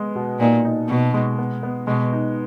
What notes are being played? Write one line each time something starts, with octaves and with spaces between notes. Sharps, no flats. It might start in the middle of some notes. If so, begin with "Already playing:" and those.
Already playing: G#3 B3
B2
A#2 D#4
D#4
B2 D#4
G#3
B3
B3
B2 G#3
D#4